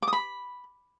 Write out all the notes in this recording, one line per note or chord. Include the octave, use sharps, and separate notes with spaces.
D6
D#6
B5